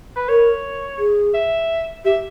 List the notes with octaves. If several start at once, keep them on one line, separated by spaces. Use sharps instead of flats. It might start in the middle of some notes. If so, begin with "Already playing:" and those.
B4
A#4 C#5
G#4
E5
G4 E5